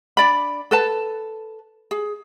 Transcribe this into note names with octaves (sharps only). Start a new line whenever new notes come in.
D4 D5 B5
A4 B4 A5
G#4